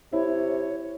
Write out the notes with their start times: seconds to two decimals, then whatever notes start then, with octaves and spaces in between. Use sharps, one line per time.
0.13 C3 E4 C#5